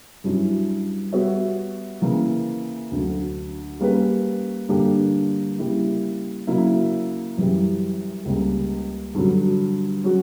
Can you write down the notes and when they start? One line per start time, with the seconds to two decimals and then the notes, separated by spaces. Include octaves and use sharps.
0.24 G2 F#3 C#4 E4
1.12 G3 B3 F#4 C#5 E5
2.01 C#3 E3 A#3
2.91 D2 D3 F#3
3.80 G3 A#3 C#4 G4 B4
4.69 G2 D3 A#3 D4 G4
5.59 C#3 G3 A#3 E4
6.47 C#3 F#3 A#3 E4
7.37 F#2 E3 G3
8.25 C#2 C#3 G3 A#3 C#4
9.15 G2 D3 F#3
10.04 F#3 C#4 F#4